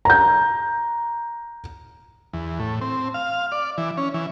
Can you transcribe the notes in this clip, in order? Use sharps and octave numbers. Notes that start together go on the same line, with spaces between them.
A#5 G6
E2
A2
C4
F5
D5
E3
C#4
E3